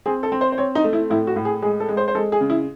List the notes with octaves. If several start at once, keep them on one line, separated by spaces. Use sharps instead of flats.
C4 G#4
A4
C4
C5
C5
C4 C#5
D#4
A3
E4
A2 E4
F#4
A2
G#4
G#3 G#4
A4
G#3
C5
C5
G#3 A4
G#4
C#3
E4